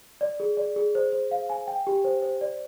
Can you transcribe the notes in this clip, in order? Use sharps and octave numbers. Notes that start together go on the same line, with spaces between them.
D5
G#4
D5
G#4
C5
C5
F5
G#5
G5
G4
C5
C5
D5